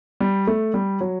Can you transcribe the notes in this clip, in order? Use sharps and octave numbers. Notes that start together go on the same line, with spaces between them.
G3
A3
G3
F#3